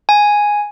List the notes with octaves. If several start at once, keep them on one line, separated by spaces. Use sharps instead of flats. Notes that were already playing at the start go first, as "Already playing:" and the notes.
G#5